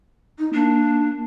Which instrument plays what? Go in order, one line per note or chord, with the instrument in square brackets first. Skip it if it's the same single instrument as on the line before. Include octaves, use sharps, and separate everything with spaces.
[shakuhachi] D#4
[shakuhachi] A#3 [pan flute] D4